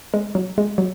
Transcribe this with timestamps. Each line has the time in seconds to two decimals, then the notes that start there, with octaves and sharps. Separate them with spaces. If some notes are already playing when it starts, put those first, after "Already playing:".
0.14 G#3
0.35 F#3
0.58 G#3
0.78 F#3